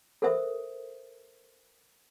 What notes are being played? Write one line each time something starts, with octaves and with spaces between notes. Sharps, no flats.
A4 A#4 C5 E5 D#6